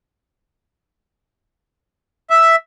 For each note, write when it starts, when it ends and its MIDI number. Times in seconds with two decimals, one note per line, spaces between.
2.30 2.56 76